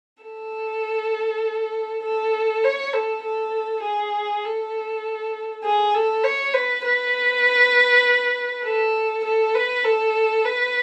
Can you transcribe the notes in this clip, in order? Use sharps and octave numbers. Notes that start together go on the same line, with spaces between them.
A4
A4
C#5
A4
A4
G#4
A4
G#4
A4
C#5
B4
B4
A4
A4
B4
A4
B4